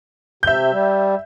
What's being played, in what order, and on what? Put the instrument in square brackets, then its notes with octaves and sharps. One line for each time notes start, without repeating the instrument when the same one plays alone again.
[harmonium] C3 [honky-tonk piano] E5 G6
[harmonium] G3